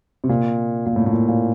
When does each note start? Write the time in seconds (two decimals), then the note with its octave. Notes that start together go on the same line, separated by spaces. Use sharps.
0.24 C3
0.29 A#2
0.86 A#2
0.96 A2
1.06 A2
1.13 A#2
1.28 A#2